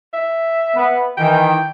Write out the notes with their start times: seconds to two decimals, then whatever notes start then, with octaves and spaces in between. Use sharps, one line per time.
0.13 E5
0.75 B3 B4
1.17 D#3 E3 G5